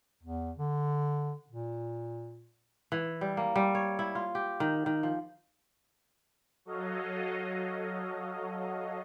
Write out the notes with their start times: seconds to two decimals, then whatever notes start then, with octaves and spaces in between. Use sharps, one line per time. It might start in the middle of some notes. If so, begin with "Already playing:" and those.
0.23 E2
0.57 D3
1.50 A#2
2.92 E3
3.21 G3
3.37 A#3
3.56 G3
3.75 C#5
3.99 E4
4.15 F4
4.35 G4
4.60 D#3
4.86 D#3
5.03 F3
6.65 F#3 F#4 A4 C#5 D#5 F5